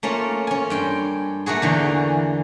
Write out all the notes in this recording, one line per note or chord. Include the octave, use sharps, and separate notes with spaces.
A3 A#3 C#4 F4
C#4 G#5
G2 G5 C6
A3 A#3 F#4 G#4
E2 D3 E3